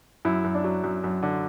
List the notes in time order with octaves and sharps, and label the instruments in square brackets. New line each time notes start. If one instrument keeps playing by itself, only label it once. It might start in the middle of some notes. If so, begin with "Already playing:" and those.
[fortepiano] F#2 E4
F#2
D4
F#3
F#2
F#2
D3